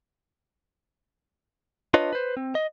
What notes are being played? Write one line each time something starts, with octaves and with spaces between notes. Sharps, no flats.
D4 F4 B4 C#5 D#5
B4 C5
C4
D#5